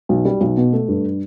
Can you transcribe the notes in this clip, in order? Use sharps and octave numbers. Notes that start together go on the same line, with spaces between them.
B1
G3
B1
B2
A3
G2